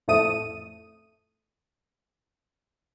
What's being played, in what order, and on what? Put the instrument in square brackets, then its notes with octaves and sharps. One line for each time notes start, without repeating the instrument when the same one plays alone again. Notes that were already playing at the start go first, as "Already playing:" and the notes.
[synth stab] A1 F2 A2 A3 D#6 D#7